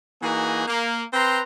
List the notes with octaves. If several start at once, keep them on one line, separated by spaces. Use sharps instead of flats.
E3 A#3 D#4 F#4 G#4
A#3
C4 B4 A#5 C6